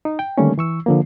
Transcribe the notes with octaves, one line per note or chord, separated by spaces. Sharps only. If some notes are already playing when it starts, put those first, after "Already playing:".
D#4
G5
D3 D#3 G3 A3 A#3 C#4
E3 C#6 E6
D3 F3 A#3